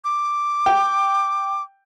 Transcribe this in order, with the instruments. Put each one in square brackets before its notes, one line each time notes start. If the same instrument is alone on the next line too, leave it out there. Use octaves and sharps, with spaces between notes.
[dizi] D6
[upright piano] G5